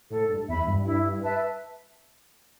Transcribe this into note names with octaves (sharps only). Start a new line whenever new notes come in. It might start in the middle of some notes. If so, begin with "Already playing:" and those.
A2 A4
G2
E2 E5 B5
G2
E4
B4 E5 A5